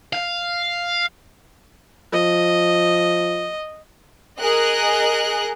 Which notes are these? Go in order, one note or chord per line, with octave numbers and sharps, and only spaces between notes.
F5
F3 D#5
G#4 A#4 D#5 F#6